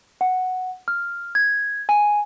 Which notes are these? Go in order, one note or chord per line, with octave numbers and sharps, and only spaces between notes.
F#5
F6
G#6
G#5